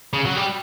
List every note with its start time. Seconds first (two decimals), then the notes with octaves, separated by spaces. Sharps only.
0.13 C#3
0.25 F#3
0.37 G3